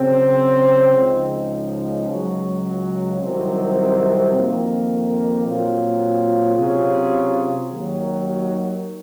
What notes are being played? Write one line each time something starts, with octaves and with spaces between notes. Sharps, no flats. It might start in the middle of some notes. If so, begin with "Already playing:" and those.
Already playing: C#3 F#3 C4
C#2 C#3 F3 G#3 D#4
C#2 C#3 F#3
C2 C3 D#3 F#3 C4
F2 D#3 A#3
A#2 F#3 C4 F4
C3 F#3 C#4 F4 G#4
D#2 D#3 F#3